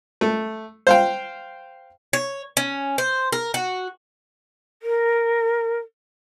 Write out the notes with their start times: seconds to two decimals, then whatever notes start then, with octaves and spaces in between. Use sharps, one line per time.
0.21 A3
0.87 C5 F5 G5
2.13 C#5
2.57 C#4
2.98 C5
3.32 A#4
3.54 F#4
4.82 A#4